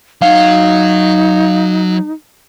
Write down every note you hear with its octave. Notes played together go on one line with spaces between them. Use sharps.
F#3 D#4 F#4 F5